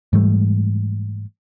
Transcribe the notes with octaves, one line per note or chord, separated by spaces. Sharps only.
G#2 E3 G3 A3